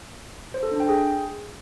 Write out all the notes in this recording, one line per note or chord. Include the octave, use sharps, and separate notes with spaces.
C5
A4
D4
G5
G#4